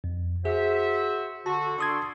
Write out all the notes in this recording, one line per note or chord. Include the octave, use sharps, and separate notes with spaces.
F2
F#4 G#4 C5 E5
D3 F#4 A5
D4 A4 C6 C#6 D#6 G#6